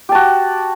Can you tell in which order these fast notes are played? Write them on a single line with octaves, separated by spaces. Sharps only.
G4 A5 F#4